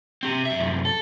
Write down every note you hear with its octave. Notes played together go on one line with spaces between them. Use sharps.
C4 G4
F#2 E5
F#2 C3
A4